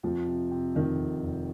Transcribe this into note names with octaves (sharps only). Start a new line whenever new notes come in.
F2 F3
C3
C3
F1 D#3
F1
F1